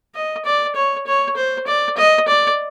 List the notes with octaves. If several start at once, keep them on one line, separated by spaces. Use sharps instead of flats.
D#5
D5
C#5
C#5
C5
D5
D#5
D5